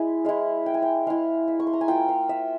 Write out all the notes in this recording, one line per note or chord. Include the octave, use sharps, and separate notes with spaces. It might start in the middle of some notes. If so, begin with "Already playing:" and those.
Already playing: G#3 E4 G#5
G#3 E4 F5
G5
G#5
G5
G#3 E4 F5
E5
C#6
C6
A#5
G#5
A#3 F4 G5
F5
E5